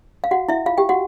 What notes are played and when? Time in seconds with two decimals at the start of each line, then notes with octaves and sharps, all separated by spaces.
0.24 F5
0.31 F#4 F#5
0.49 E4 E5
0.66 F4 F5
0.78 G4 G5
0.89 F#4 F#5